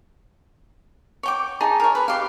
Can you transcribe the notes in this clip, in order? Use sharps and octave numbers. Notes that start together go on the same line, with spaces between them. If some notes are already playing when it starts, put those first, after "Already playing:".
C#5 G5 D6
D#4 G#4 A5
A#4 C#5
B4
G4 F5